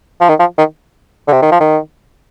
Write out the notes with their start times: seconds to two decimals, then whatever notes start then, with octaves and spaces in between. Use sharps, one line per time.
0.21 F3
0.29 D#3
0.40 F3
0.58 D#3
1.28 D3
1.33 C3
1.42 D#3
1.52 F3
1.60 D#3